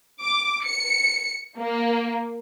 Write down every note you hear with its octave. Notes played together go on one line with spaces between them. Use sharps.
D6
C#7
A#3